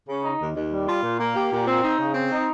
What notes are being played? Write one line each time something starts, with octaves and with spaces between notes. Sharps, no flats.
C#3
D#4
D#2
D#2
G3
F4
A#2
A#3
G4
A#2
C4
D#4
C#3
C4
D#4